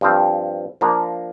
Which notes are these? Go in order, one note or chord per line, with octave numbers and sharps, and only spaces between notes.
G2 F3 C4
F3 A#3 D4 A#4